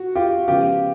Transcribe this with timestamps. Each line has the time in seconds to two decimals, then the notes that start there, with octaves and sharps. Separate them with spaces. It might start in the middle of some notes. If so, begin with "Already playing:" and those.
Already playing: F#4
0.15 F4 G4
0.48 C#3 F3 G#3 B3 F4 G4